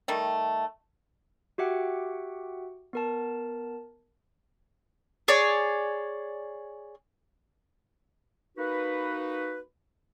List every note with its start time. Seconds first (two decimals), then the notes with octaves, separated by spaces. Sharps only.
0.08 D#3 G3 A3
1.58 F#4 G4 E5 F#5 G5
2.93 B3 A#4 A5
5.28 G#4 C#5 D5
8.57 A#3 D#4 F#4 B4